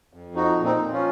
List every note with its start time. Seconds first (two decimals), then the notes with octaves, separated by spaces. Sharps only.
0.13 F2
0.35 F3 D#4 F#4
0.57 A#2
0.64 C4 D#4
0.79 F3
0.92 C#4 F4